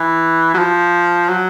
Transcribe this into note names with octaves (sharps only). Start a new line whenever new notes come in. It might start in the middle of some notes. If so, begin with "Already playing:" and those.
Already playing: E3
F#3
F3
F#3